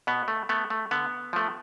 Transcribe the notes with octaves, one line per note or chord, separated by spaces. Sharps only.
B2 B3
A3
A3 B3
A3
D3 B3
F3 A3